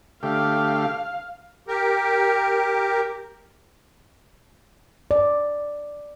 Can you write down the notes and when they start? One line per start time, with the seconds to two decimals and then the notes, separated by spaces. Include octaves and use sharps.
0.23 D3 A3 G4 F5
1.67 G4 A#4
5.11 D5